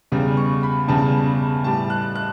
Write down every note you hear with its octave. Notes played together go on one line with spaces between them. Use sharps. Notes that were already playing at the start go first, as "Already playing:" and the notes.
E2 C#3 G3
C#6
B5
E2 C#3 G3 A5
A2 G3 A5
F#6
F#6